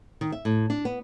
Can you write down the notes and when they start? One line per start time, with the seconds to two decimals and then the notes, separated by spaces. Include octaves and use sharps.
0.21 D#3
0.32 E5
0.45 A2
0.70 D4
0.85 B3